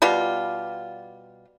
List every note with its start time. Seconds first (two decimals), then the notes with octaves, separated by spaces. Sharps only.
0.02 B2 G3 F4